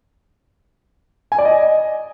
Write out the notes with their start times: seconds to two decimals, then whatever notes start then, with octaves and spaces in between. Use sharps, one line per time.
1.32 G#5
1.38 D5
1.45 D#5